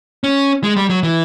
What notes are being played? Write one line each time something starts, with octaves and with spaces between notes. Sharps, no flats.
C#4
G#3
G3
F#3
E3